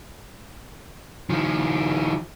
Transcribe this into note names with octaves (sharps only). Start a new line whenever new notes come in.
D#3 F3